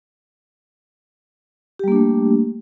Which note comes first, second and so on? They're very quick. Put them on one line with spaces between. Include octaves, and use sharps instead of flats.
G4 G3 A#3 D4 A3